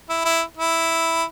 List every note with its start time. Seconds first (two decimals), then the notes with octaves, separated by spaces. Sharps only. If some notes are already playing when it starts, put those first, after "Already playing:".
0.09 E4
0.25 E4
0.57 E4